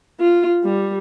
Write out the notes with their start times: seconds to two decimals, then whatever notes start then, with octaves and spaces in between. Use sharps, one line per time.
0.20 F4
0.64 G3